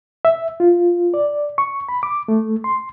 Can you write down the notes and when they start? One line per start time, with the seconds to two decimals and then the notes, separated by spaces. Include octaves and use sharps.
0.25 E5
0.60 F4
1.14 D5
1.58 C#6
1.89 B5
2.03 D6
2.28 A3
2.64 C6